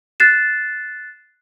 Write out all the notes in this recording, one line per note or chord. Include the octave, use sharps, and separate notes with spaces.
F#6 A6 C7 E7